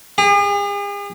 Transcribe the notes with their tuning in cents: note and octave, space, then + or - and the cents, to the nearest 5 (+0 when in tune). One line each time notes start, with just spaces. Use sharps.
G#4 -45